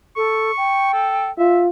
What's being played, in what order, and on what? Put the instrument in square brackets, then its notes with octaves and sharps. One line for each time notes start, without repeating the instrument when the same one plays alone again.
[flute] A4 [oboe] C#6
[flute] G5
[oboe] A4
[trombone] F4 [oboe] E5